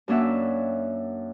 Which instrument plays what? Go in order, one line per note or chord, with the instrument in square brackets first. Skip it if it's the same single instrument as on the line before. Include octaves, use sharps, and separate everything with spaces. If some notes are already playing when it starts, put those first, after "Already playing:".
[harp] F#2 A#3 C#4 D4 E5 F#5